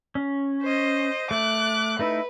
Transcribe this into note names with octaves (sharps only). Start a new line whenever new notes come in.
C#4
C5 D#5
A3 D6 F#6
A3 D#4 E4 B4